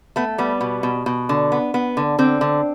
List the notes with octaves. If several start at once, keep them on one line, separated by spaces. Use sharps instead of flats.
A3 B3
G3 B3
B2
B2
B2
D3
B3
B3
D3
D3 C4
D3